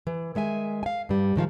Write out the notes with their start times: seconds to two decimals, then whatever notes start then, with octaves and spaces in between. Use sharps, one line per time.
0.07 E3
0.35 D#3 G#3 E5 G#5
0.83 F5 G#5
1.09 G2 G3
1.36 G#2 D#3 F3 F5